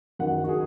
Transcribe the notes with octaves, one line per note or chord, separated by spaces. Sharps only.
F#2 D#3 F#5
F#4
G#4